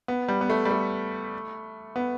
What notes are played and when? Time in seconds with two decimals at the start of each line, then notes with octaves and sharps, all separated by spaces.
0.08 B3
0.28 G3
0.41 B3
0.50 A3
0.65 G3
0.71 A3
1.96 B3